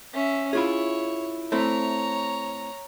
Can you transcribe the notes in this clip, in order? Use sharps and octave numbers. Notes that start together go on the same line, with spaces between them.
C#4 E5
E4 F4 G#4 C#5
A3 C4 E4 C#5 A#5